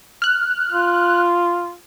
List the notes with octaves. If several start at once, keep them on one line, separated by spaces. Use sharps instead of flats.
F6 F#6
F4